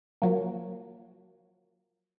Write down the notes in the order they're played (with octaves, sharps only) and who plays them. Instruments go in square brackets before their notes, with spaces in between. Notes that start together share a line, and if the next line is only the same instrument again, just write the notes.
[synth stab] F3 F#3 A#3